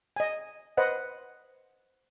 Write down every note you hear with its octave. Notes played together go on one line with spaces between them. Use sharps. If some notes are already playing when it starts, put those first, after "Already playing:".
D#5 G#5
B4 C5 D#5 F#5